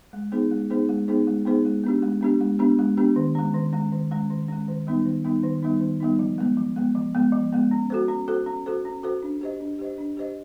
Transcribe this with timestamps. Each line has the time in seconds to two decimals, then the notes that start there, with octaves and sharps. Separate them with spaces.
0.13 G#3
0.32 B3 D#4 G#4 C5
0.51 G#3
0.70 B3 D#4 G#4 C5
0.89 G#3
1.08 B3 D#4 G#4 C5
1.27 G#3
1.46 B3 D#4 G#4 C5
1.65 G#3
1.84 B3 D4 G4
2.03 G#3
2.21 B3 D4 G4
2.40 G#3
2.59 B3 D4 G4
2.79 G#3
2.97 B3 D4 G4
3.16 D#3
3.35 G#3 C#4
3.54 D#3
3.73 G#3 C#4
3.92 D#3
4.11 G#3 C#4
4.30 D#3
4.48 G#3 C#4
4.68 D#3
4.87 G3 B3 D#4
5.06 D#3
5.25 G3 B3 D#4
5.43 D#3
5.63 G3 B3 D#4
5.81 D#3
6.00 G3 B3 D#4
6.19 F3
6.38 G#3 B3
6.57 F3
6.76 G#3 B3
6.95 F3
7.14 G#3 B3
7.33 F3
7.53 G#3 B3
7.71 C#4
7.90 F#4 A4 C5
8.08 C#4
8.28 F#4 A4 C5
8.46 C#4
8.66 F#4 A4 C5
8.85 C#4
9.03 F#4 A4 C5
9.23 D4
9.41 G4 C5 D#5
9.60 D4
9.79 G4 C5 D#5
9.98 D4
10.17 G4 C5 D#5